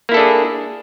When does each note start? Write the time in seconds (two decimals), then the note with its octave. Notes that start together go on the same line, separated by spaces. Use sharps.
0.09 A#3
0.12 E4
0.14 A4
0.17 D4
0.19 G#4